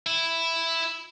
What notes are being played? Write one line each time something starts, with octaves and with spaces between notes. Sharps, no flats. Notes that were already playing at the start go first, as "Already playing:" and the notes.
E4